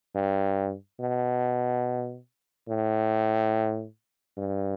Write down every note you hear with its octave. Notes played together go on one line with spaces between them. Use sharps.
G2
B2
A2
G2